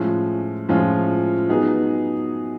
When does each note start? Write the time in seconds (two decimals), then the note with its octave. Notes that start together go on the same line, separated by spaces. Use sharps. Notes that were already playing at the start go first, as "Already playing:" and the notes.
Already playing: A2 F3 G#3 C#4 F4
0.69 A2 F3 G#3 C#4 F4
1.49 F#3 B3 D#4 G#4